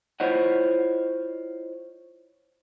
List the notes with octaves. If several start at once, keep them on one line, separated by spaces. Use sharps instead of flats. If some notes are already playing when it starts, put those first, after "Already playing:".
E4 F4 C5 C#5 D#5 F#5